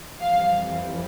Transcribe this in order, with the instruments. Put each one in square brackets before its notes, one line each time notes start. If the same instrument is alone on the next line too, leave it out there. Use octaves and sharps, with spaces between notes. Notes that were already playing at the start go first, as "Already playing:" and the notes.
[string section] F2 E3 G3 F5